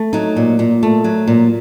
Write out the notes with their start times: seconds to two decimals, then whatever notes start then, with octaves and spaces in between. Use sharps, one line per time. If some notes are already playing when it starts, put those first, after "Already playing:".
Already playing: A3
0.13 F#3 D#4
0.36 A#2
0.59 A#2
0.83 A3
1.04 F#3
1.28 A#2